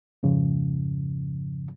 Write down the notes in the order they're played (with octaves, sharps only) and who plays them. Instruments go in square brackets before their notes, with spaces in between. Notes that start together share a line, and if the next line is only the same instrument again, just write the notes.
[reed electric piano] F2 G#2 C#3 F3